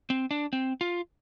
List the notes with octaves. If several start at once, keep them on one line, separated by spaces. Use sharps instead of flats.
C4
D4
C4
F4